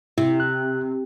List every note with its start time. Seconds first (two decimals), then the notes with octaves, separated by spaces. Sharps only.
0.18 C3 E4
0.40 F#6